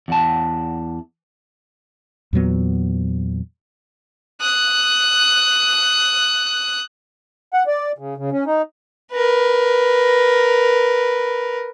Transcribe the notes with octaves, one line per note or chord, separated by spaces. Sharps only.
E2 F#5 A5
E2 A#2 F#3 B3
D#6 F#6
F#5
D5
C#3
C#3
C#4
D#4
A#4 B4